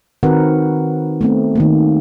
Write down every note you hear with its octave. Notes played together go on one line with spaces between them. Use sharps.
D#3 C4 F#4 A#4 B4 F#5
A3 B3 C4
D#3 A3 A#3